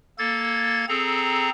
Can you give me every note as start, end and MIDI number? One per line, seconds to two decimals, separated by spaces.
0.19 0.85 58
0.19 0.85 69
0.19 0.85 92
0.19 0.85 93
0.88 1.50 60
0.88 1.50 68
0.88 1.50 69
0.88 1.50 82